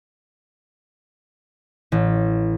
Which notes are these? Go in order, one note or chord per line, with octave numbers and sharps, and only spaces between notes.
A1